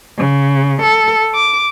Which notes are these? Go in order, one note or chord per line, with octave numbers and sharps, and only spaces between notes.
C#3
A4
D6